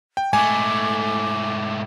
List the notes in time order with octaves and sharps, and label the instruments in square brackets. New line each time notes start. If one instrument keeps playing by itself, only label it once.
[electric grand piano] G5
[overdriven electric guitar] G#2 A3 [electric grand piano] G#5 [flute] D6